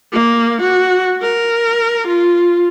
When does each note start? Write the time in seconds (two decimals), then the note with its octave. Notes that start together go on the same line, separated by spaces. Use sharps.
0.13 A#3
0.61 F#4
1.22 A#4
2.07 F4